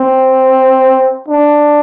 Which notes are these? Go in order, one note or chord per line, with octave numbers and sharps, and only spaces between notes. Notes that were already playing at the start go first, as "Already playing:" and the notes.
Already playing: C4
D4